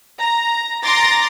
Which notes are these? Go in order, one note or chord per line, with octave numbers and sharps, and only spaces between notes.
A#5
A#5 C6 D6 A6 A#6